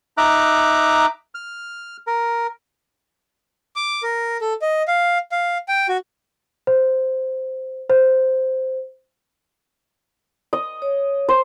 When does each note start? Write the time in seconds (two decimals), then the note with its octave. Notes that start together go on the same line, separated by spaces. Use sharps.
0.18 D#4 E5 A#5 D6 F#6
1.35 F6
2.07 A#4
3.76 D6
4.03 A#4
4.41 A4
4.62 D#5
4.88 F5
5.32 F5
5.68 G5
5.89 F#4
6.67 C5
7.90 C5
10.53 D#5
10.82 C#5
11.29 C5